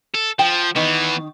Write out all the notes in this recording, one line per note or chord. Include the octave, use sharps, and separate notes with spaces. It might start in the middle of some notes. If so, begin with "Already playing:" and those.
A4
F3 G5
D#3 E3 B3